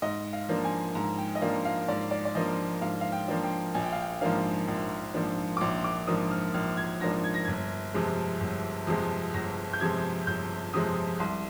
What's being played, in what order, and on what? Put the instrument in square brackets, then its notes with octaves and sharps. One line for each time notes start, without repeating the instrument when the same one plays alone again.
[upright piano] G#2 D#5
F5
F3 A#3 D4
G#5
G#2 A#5
G5
D#5
F3 A#3 D4 F5
F5
G#2 D5
D5
D5
F3 A#3 D4 D#5
G#2 F5
F5
G5
F3 A#3 D4
G5
A#1 G#5
G5
F5
G5
G#2 F3 A#3 D4 F5
A#1
G#2 F3 A#3 D4
D6
A#1 C6
D6
G#2 F3 A#3 D4 D#6
F6
A#1 F6
G#6
G#2 F3 A#3 D4 A#6
G#6
A#6
G1 G#6
F2 C3 F3 G#3
G1
F2 C3 F3 G#3
G1 A#6
G6
F2 C3 F3 G#3 G#6
G1 G6
F2 C3 F3 G#3 D#6
C2 C6